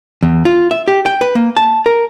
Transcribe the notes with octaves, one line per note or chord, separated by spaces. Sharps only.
E2
F4
E5
G4
G5
B4
A#3
A5
A#4